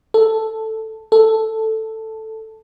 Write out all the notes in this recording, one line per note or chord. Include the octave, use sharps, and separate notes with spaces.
A4
A4